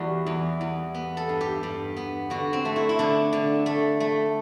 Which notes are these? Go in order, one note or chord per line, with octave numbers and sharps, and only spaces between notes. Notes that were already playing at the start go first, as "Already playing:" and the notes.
Already playing: E2 G3 F#4
E2
E2
B3
A4
G2
G4
G2
B3
D3 F#4
C4
A3
E4
E4
D3 D4
D3
A3
A3